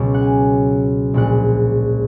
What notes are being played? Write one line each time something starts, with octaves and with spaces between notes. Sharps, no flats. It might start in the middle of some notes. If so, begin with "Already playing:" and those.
Already playing: C#2 B2 F#3
F#5
G#5
A#1 A#2 G#3 F#5